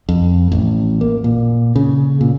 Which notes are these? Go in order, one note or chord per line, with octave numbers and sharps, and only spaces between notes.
F2
A1
A#3
A#2
C#3
A#2